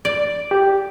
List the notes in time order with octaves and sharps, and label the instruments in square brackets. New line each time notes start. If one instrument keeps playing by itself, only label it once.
[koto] D5
[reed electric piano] G4